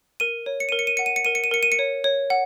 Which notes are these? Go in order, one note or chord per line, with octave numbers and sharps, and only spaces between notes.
A#4 D#7
C#5
C#7
A#4 D#7
C#7
D#7
F#5 C#7
D#7
C#7
A#4 D#7
C#7
D#7
A#4 C#7
D#7
C#7
C#5
C#5
F#5